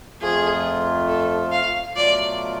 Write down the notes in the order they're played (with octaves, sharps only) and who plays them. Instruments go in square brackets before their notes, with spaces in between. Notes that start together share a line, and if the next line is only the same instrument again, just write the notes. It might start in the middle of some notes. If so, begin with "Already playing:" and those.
[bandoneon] F2 F3 A3 F4 [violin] G#4
[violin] A4
F5
[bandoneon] B2 F#3 A3 F4 [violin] D5